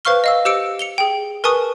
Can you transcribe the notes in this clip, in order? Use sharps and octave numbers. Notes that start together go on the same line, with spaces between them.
B4 C5 F5 C#6 F6 G7
D#5 F5 E6
G4 C5 E6 C#7 D7
C#7 F7 G7
G#4 G5
A#4 B4 G#5 A5 C#6 D#6